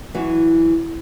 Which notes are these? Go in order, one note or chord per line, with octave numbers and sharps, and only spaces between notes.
E3 F#3 F#4